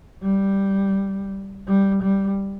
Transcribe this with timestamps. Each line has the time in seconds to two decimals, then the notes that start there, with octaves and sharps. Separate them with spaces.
0.23 G3
1.67 G3
2.03 G3